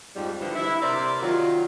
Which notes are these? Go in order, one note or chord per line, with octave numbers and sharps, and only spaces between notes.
F2 G#2 F3 G3
D3 E3 F3 C4 G4 C5
E4
C3 A#4 C5 D5
D#3 F#3 F4